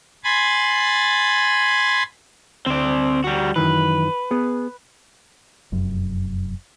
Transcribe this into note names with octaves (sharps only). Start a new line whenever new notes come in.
G#5 B5 C6 A6
D2 C4 D5
G3 F#4
F#2 D#3 E3 B4
B3 G#4
F1 F#2